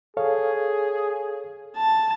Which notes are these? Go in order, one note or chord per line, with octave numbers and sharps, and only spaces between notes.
G#4 A4 C#5 F5
A5